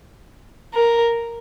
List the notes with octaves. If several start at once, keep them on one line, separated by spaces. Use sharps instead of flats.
A#4